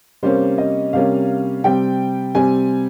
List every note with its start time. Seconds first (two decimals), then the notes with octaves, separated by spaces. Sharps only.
0.22 C3 G3 A#3 C#4 C5
0.58 D#5
0.93 C3 G3 A#3 C#4 F5
1.64 C3 G3 C4 G5
2.35 C3 G3 C4 G#5